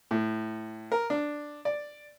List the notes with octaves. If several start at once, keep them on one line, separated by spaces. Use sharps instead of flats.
A2
A#4
D4
D5